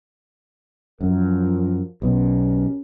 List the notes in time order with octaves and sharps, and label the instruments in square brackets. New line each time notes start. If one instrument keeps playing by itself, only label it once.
[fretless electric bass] F#2 [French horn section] F3 A#4
[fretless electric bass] B1 B2 [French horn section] C#4 G4 A#4